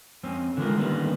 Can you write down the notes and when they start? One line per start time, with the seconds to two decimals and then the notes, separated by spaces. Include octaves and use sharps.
0.23 F2 C4 C#4
0.57 D3 E3 F3 G#3 F4 A#4
0.78 D3 D#3 G3 A#3 B3 C#4